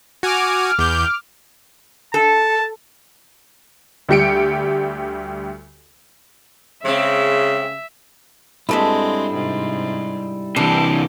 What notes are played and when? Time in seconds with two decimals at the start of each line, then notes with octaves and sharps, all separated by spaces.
0.23 F#4 G#5 D6 F6
0.79 E2 G6
2.14 A4 A5
4.09 D2 G3 G4 C#7 D7
6.85 C#3 G#3 C4 E5
8.69 G2 G3 G#3 C4 E4 A4 E5
9.34 G#2 C3
10.56 C3 E3 D4 G4